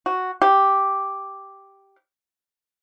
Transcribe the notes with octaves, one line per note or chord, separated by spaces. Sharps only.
F#4
G4